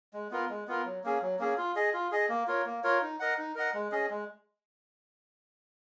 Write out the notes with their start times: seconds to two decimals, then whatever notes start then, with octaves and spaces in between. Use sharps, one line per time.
0.13 G#3
0.31 B3 F4 A#4
0.49 G#3
0.68 B3 F4 A#4
0.85 F#3
1.04 A#3 C#4 G#4
1.22 F#3
1.39 A#3 C#4 G#4
1.58 F4
1.75 G#4 D#5
1.93 F4
2.11 G#4 D#5
2.29 A#3
2.47 F4 A#4 C#5
2.66 A#3
2.83 F4 A#4 C#5
3.02 D#4
3.20 A#4 D#5 F#5
3.38 D#4
3.55 A#4 D#5 F#5
3.74 G#3
3.91 C#4 G#4 D#5
4.10 G#3